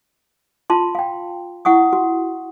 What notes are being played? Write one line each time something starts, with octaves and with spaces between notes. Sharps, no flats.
F4 A5 C6
F5 G5
E4 F#5 C#6 D#6
F#4